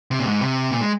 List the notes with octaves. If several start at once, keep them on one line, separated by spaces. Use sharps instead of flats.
C3
A#2
G#2
C3
A#2
G#3